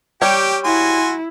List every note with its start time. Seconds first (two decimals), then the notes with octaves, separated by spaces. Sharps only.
0.22 G3 G4 C#5 G5
0.64 E4 F#4 G#5 C6